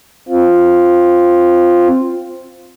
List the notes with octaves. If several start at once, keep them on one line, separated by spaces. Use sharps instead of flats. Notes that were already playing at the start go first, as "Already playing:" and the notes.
C4 F4